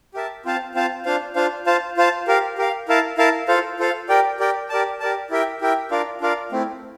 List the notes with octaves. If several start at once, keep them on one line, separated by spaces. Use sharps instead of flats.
G4 A#4 E5 A5
C4 F4 C5 F5 A5
C4 F4 C5 F5 A5
D4 F4 C5 F5
D4 F4 C5 F5
F4 C5 F5 A5
F4 C5 F5 A5
G4 A#4 F5
G4 A#4 F5
E4 A#4 F5 A5
E4 A#4 F5 A5
F4 A4 C5 F5
F4 A4 C5 F5
G4 A#4 D5 G5
G4 A#4 D5 G5
G4 A#4 D5 A5
G4 A#4 D5 A5
E4 G4 A#4 E5 G5
E4 G4 A#4 E5 G5
D4 F4 A#4 D5 F5
D4 F4 A#4 D5 F5
A3 C4 E4